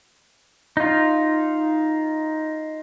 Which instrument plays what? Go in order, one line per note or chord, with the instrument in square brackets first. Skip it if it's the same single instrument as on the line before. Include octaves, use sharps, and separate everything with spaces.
[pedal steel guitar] D#4 F4